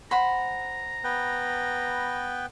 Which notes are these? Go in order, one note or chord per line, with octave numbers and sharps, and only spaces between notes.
C5 F#5 A#5 B5
B3 B4 G5